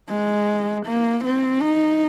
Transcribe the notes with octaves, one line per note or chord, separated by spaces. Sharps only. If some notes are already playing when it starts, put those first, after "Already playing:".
G#3
A#3
C4
D#4